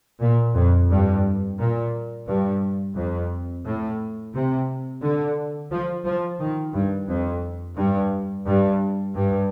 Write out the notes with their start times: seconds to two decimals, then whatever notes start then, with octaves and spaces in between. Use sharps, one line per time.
0.21 A#2
0.55 F2
0.90 G2
1.59 A#2
2.27 G2
2.95 F2
3.65 A2
4.33 C3
5.02 D3
5.71 F3
6.05 F3
6.39 D#3
6.74 G2
7.08 F2
7.77 G2
8.46 G2
9.15 G2